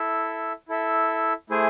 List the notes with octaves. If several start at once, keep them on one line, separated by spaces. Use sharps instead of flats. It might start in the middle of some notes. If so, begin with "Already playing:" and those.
Already playing: E4 A4 E5
E4 A4 E5
A3 E4 G#4 C5 G#5